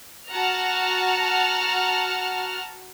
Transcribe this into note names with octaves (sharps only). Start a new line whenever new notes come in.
F#4 F#5 A5 A#5 F6